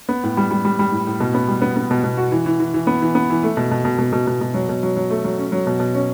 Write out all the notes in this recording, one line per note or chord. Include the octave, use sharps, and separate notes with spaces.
B3
A2
G3
G3
G3
G3
A2
A2
B2
B3
G3
B3
B3
B2
B2
F#4
E3
E3
E3
E3
B3
E3
B3
E3
A3
B2
B2
B2
B2
B2
B2
B2
F#3
B2
F#3
F#3
A3
F#3
C#4
F#3
B2
B2
C#4